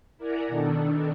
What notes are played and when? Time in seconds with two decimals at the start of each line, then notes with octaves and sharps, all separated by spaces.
0.18 E4 A#4 D5 F#5 G#5 A#5
0.48 B2 D#3 D4 A4